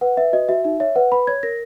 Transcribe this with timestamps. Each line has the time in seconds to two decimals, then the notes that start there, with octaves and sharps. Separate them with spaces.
0.01 B4 F#5
0.17 B4 E5
0.33 F#4 D#5
0.49 F#4 E5
0.64 D#4 E5
0.80 C#5 E5
0.96 B4 F#5
1.12 B4 B5
1.27 C#5 G#6
1.43 A#4 A#6